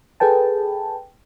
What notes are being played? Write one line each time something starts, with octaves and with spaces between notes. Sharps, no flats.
G#4 A4 B4 G5 A5